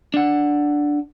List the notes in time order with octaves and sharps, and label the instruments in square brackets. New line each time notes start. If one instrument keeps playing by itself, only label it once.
[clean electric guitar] D4 F#5